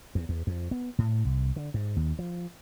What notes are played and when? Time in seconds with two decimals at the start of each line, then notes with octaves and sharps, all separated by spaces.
0.15 E2
0.29 E2
0.47 F2
0.71 B3
0.99 A2
1.25 C2
1.56 D3
1.74 G#2
1.96 D#2
2.19 F3